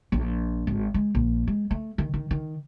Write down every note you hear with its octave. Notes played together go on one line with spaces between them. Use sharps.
A#1
G#1
G#3
A#1
G#3
A3
D#3
D#3
D#3